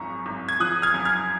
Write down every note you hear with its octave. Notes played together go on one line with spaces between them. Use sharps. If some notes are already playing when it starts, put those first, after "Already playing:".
Already playing: G#1 F#2 F3 A#5 C#6
G#1
G#6
F3 D#6 F#6
F6 G#6
F#2
F6 G#6